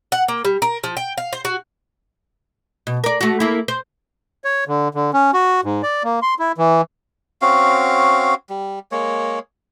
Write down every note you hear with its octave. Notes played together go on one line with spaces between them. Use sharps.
F#5
A#3
G3
A#4
F3
G5
F5
C5
F#4
B2
A#4 D5
A3 F#4
A#3 E4
C5
C#5
D3
D3
C#4
F#4
G#2
D5
A#3
C6
E4
E3
C4 C#4 F#4 F5
G3
G#3 A#3 C#5